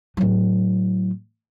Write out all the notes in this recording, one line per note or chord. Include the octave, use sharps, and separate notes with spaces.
A2 F#3